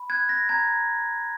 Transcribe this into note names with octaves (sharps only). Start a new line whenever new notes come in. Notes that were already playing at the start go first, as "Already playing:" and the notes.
Already playing: B5
F#6 G#6
A#6
A#5 G#6